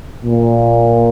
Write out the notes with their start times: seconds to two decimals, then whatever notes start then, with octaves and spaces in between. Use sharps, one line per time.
0.24 A#2